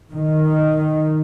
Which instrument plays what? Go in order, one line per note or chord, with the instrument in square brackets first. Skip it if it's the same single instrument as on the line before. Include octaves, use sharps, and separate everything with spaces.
[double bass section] D#3